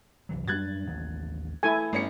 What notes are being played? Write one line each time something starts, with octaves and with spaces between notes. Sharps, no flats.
C2 E3 F#3
F#2 G3 D4 F#6 G#6 A6
A1 D#2
A3 E4 A4 G#5
G1 A3 C#4 C#7